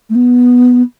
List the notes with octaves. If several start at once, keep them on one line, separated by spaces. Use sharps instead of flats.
A3
B3